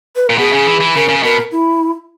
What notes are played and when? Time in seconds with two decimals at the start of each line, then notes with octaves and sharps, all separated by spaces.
0.16 B4
0.27 A#2 A#4
0.38 B2 G#4
0.53 C#3
0.67 E3
0.80 E3
0.95 C#3 A#4
1.09 C#3
1.23 B2 A#4
1.51 E4